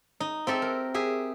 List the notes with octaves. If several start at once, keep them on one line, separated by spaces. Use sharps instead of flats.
D#4
C4 G4 A4 E5
A#4
G4 G#4 E5